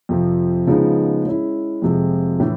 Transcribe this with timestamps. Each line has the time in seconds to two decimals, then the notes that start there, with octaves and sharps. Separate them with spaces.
0.09 F2 C3 F3
0.67 C#3 F3 G#3 B3 D#4
1.25 G#3 C#4 E4
1.82 F2 C3 F3 G#3
2.40 A2 E3